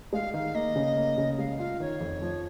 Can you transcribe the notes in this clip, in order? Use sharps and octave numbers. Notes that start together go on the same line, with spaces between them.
G#3 F5
D#3 F5
A#3 D#5
C#3
A#3
C#3
G#3 F5
F4 F5
D#3 C#5
F2
F3